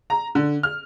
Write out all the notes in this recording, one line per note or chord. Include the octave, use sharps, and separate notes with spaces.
A#5
D3
F6